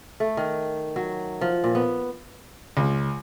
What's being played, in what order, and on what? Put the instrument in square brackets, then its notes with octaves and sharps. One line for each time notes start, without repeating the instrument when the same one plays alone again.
[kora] A3
D#3
F#3
F3
A#2
B3
[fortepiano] C#2